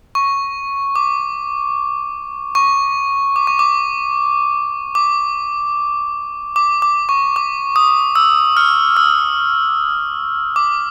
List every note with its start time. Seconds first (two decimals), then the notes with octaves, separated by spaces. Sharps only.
0.15 C#6
0.96 D6
2.55 C#6
3.36 D6
3.47 C#6
3.59 D6
4.95 D6
6.56 D6
6.82 D6
7.09 C#6
7.36 D6
7.76 D#6
8.15 E6
8.57 F6
8.97 E6
10.56 D6